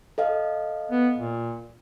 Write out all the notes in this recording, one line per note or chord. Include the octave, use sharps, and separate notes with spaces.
A4 D#5 F5
B3
A#2